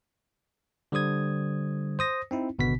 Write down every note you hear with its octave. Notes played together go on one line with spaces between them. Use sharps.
D3 G3 C5 D#6 G#6
C5 D#6 A#6
C4 D#4 E4
G#1 B2 D3 B3 B6